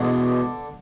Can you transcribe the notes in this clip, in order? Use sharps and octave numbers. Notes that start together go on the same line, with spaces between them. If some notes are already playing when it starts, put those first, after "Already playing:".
Already playing: E2 B2 D3 G#3 D4